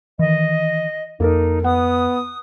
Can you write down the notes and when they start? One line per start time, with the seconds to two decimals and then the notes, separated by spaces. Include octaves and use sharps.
0.19 D#3 E3 D#5
1.20 F2 A#3 D#4 A4 A#4
1.64 B3 F#5 D#6